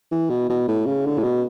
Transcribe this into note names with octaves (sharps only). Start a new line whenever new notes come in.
E3
B2
B2
A2
C#3
D3
A2
B2